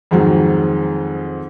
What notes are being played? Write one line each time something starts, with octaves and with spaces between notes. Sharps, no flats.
F2 G#2 D#3 F#3 G#3